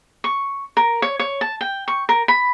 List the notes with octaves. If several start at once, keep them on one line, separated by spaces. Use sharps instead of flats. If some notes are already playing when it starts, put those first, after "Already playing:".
C#6
A#4
C#5
C#5
A5
G5
C#6
A#4
B5